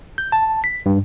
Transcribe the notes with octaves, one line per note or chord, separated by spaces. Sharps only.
G6
A5
B6
G2